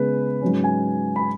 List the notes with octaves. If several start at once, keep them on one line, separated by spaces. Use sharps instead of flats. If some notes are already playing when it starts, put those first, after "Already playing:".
Already playing: C#3 G#3 B3 B4
G#2 F#3 C#4
G#5
B5